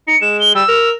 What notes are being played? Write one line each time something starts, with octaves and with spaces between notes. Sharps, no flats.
D#4 C#7
G#3 E7
G7
G3 E6
A#4